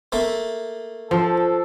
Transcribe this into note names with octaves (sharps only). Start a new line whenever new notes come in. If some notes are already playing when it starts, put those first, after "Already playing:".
A3 A#3
F3 A4